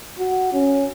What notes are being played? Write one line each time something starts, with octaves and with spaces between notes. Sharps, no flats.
F#4
C#4